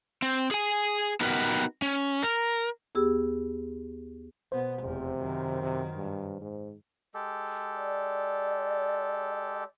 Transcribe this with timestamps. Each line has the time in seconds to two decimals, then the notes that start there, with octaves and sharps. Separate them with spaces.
0.22 C4
0.51 G#4 G#5
1.21 B3 D#4 F#4 G4 A#4 B4
1.82 C#4
2.23 A#4
2.95 D#2 B3 G4 G#4 E6
4.52 B2 B3 C5
4.83 F1 E2 C3
5.19 F#2 D#3
5.62 C3
5.96 G2
6.41 G#2
7.14 G#3 G4 A4
7.76 D5